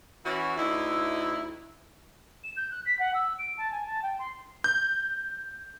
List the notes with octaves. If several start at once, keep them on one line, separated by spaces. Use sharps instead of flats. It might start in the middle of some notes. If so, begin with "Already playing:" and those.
E3 C#4 E4 F#4
D2 D#4 E4
E7
G6
F#6
B6
F#5
E6
D7
A5
G#5
A5
G5
C6
G6